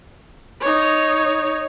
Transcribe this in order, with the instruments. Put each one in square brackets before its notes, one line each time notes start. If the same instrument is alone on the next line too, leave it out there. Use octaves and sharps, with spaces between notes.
[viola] D#4 C#5